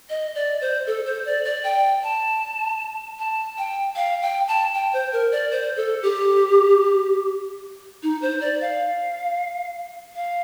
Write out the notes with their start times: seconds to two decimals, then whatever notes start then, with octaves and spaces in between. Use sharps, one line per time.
0.10 D#5
0.35 D5
0.61 C5
0.87 A4
1.06 C5
1.25 D5
1.45 D5
1.64 G5
2.03 A5
3.19 A5
3.58 G5
3.96 F5
4.22 G5
4.48 A5
4.74 G5
4.93 C5
5.13 A#4
5.32 D5
5.51 C5
5.77 A4
6.03 G4
8.03 D#4
8.22 C5
8.41 D5
8.61 F5
10.15 F5